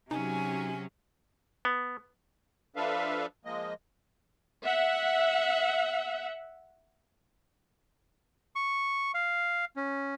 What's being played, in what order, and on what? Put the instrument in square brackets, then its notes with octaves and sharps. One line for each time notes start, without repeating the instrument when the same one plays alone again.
[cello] C3 F#3 [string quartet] C#4 F#4 G#4 [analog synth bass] D#4 [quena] G#5
[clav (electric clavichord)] B3
[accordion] F3 D4 A4 B4 E5 F5
F3 G#3 A#3 D#5
[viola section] E5 F#5
[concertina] C#6
F5
C#4